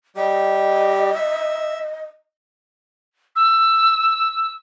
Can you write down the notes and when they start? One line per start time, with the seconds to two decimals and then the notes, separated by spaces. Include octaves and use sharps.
0.16 G3 G4 D#5
1.15 E5
3.36 E6